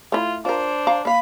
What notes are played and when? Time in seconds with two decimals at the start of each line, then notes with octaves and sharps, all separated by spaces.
0.12 A3 E4 F4
0.45 D4 F4 A#4 C5
0.87 F5 A#5
1.05 A#3 F5 B5